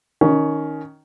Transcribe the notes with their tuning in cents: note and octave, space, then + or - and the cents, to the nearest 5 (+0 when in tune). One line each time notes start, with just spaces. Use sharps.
D#3 +0 C#4 +15